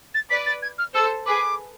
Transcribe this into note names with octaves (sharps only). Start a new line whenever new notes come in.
A6
B4 D5 B6
A6
G#6
F6
A4 C5 E6
G#4 B4 D6